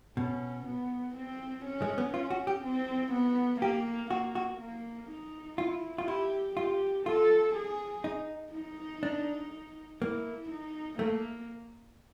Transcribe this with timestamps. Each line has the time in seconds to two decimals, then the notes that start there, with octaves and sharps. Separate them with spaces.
0.17 B2 C#4
0.66 B3
1.16 C4
1.65 C#4
1.82 G#3
1.98 B3
2.14 C#4 F4
2.30 F#4
2.47 G4
2.63 C4
3.13 B3
3.61 A#3 G4
4.10 A#3 F#4
4.35 F#4
4.60 A#3
5.10 D#4
5.58 E4 F4
5.98 F4
6.07 E4 G4
6.56 F4 G4
7.06 F4 A4
7.55 G#4
8.04 D#4
8.53 D#4
9.03 D4
10.01 A#3 E4
10.51 D#4
10.99 A3 A#3